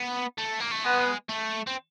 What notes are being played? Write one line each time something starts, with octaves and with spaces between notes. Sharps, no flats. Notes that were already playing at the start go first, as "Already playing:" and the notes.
Already playing: B3
A3
A#3
A3
G#3 B3
A3
C4